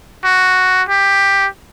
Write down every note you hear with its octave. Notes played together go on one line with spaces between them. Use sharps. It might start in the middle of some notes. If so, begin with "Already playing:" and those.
F#4
G4